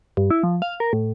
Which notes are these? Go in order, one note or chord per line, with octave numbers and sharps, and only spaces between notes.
G2
E4
F3
F5
A#4
A2